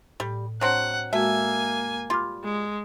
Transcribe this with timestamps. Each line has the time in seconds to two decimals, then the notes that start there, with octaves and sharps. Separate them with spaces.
0.20 A2 G3
0.61 F#3 C4 D4 C#5 F#5
1.13 G#3 A#3 F#4 A4 E5 G#5
2.10 G3 F4 C6 D6 F6
2.44 G#3